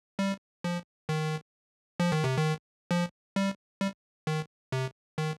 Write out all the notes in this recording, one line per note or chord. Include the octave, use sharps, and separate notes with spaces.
G3
F3
D#3
F3
D#3
C3
D#3
F3
G3
G3
D#3
C3
D#3